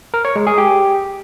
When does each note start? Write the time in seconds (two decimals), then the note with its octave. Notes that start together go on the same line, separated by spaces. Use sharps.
0.14 A#4
0.25 C#5
0.36 G#3
0.47 G#4
0.58 G4